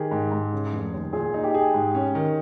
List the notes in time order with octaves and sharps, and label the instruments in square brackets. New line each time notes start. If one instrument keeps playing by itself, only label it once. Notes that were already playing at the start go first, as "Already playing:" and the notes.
Already playing: [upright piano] D#3 [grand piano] G4 G#4
[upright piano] G#2
G#2
C#3
F1
D#2
[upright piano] A#2 [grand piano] G#4
[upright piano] D#4
[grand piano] G4
[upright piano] G#4
G#2
C#4
D#3